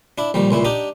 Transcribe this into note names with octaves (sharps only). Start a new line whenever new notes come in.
D4 E4
A#1 D#3 G3
C#2 A#2 E4
D4 D#4 G4